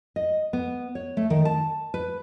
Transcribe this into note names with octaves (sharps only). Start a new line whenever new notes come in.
D#5
B3
C#5
A3
D#3
A5
B4